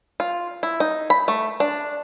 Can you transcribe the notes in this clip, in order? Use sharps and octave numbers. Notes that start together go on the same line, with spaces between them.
F4
E4
D#4
B5
A3
D4